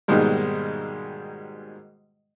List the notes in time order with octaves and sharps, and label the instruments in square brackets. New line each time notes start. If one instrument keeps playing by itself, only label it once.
[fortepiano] G#2 B2 D#3 G3 G#3 A#3